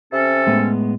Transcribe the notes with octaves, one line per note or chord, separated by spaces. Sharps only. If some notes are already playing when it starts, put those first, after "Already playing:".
C3 C#4 A4
A2 G#3 B3